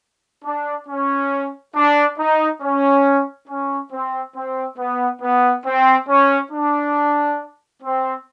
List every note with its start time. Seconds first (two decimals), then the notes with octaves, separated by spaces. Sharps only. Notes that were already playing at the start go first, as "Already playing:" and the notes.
0.44 D4
0.88 C#4
1.75 D4
2.18 D#4
2.62 C#4
3.48 C#4
3.92 C4
4.36 C4
4.78 B3
5.22 B3
5.66 C4
6.09 C#4
6.52 D4
7.83 C4